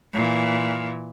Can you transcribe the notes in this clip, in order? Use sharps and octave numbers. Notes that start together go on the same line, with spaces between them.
A#2 E3